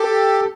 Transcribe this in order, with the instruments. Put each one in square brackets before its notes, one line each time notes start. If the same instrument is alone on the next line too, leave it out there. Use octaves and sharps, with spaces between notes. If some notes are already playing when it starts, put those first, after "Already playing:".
Already playing: [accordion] G4 A4